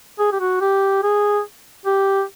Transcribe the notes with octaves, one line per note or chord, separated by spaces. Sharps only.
G#4
G4
F#4
G4
G#4
G4